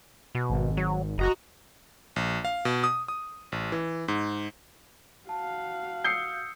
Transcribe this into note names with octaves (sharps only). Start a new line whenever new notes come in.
B2
G#1
F#3
F#1 F#4 D#5 A#5
A#1
F5
B2
D#6
D#6
A1
E3
G#2
F#4 F5 A5
D#6 E6 G6 C7 C#7